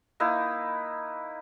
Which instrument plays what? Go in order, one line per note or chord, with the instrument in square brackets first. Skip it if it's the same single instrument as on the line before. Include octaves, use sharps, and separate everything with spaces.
[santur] A#3 D#4 E4 B4